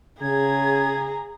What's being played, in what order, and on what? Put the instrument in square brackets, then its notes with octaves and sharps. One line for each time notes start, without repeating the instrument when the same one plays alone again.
[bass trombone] C#3 [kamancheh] G#4 A#5 [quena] G#6